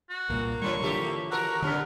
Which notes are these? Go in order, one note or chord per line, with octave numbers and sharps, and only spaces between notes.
F#4
C2 G2 A#2 A#3
D3 E3 G3 C#6
D3 E3 F3 A3 G4 A4
F#4 A4 A#4 A#5
B2 D3 G3 C#4 D4 A#4